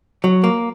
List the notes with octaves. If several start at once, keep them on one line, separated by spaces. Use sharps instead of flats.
F#3
A#3